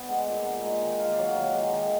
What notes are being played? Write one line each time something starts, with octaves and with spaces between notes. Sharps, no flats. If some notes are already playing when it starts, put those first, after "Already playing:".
Already playing: B3 D5 F#5
G#3
A#2
D#4
G#3
D#3
A#3 F5
F#3 D5
F5
D#3 F#5
G#3 F5
D#3
D#5